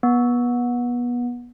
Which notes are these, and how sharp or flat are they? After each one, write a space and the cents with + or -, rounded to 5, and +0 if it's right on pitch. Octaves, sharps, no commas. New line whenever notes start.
B3 -25